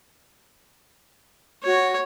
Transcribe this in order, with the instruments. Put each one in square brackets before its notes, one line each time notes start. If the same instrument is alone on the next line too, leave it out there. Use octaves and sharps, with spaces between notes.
[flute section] F#4 [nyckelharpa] C#5